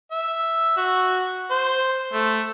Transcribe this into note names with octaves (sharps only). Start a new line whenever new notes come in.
E5
F#4
C5
A3